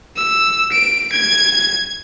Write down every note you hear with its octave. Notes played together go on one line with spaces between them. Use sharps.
E6
D7
G#6